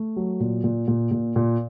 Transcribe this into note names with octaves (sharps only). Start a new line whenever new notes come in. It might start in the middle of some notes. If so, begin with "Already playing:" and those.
Already playing: A3
F#3
A#2
A#2
A#2
A#2
A#2